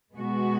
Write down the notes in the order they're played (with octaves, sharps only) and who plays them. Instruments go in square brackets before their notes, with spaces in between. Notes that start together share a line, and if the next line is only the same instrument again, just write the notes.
[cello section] B2 G#3 B3 F#4